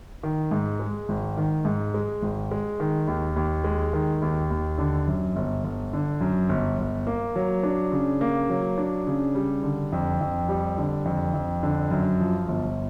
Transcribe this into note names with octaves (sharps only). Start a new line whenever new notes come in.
D#3
G#2
G#3
G#1
D#3
G#2
G#3
G#1
G#3
D#3
D#2
D#2
G#3
D#3
D#2
D#2
D3
F#2
G1
G1
D3
F#2
G1
G1
A#3
F#3
D4
C#3
A#3
F#3
D4
C#3
G3
D3
F2
F2
G3
D3
F2
F2
D3
F#2
F3
G1